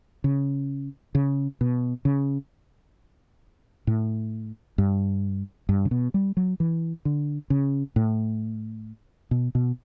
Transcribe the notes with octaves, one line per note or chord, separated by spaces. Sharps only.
C#3
C#3
B2
C#3
A2
G2
G2
C#3
B2
G3
F#3
E3
D3
C#3
A2
B2
B2